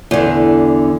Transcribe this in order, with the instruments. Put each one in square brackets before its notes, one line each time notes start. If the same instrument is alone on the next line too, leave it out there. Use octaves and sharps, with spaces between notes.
[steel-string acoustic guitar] E2 D3